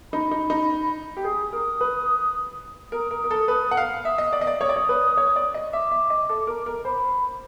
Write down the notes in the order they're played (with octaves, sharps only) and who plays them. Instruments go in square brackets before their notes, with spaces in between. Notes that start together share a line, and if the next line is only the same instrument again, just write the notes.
[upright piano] D#4 [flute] B5
[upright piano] D#4
D#4
G4
[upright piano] G#4 [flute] D#6
[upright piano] A#4
B4
[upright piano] A#4 [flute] D#6
[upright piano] A#4
A#4
A4
B4
F#5
F5
[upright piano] E5 [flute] D#6
[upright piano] D#5
D5
D#5
D5
[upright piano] C#5 [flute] D#6
[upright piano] D5
C#5
B4
C#5
D5
D#5
[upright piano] E5 [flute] D6
[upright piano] E5
D#5
A4
A#4
A#4
[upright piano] C5 [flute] B5